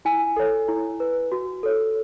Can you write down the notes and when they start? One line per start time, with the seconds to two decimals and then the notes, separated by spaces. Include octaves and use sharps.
0.05 E4 G#5
0.36 A4 C#5
0.68 E4
1.00 B4
1.32 F#4
1.63 A4 C#5